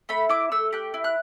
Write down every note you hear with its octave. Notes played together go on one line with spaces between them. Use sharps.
A3 B5
E4 D6
A3 E6
G4 F#6
E4
F#6